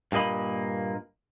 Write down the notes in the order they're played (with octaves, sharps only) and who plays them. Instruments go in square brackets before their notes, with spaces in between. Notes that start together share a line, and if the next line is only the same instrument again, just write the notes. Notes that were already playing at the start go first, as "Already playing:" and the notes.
[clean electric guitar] G2 A#2 A#3 D#5 B5